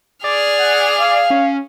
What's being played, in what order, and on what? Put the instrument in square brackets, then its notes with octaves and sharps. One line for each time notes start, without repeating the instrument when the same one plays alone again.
[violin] G#4 F6 [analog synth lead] D5
[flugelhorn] F#5
F5
[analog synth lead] C#4